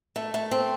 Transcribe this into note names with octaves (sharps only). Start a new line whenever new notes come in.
A3
A3
C4